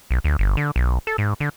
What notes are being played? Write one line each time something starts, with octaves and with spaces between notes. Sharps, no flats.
B1
D2
G1
D3
B1
A4
G#2
D3